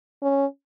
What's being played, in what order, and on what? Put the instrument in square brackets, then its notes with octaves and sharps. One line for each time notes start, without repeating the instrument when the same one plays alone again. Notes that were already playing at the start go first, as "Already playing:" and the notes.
[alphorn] C#4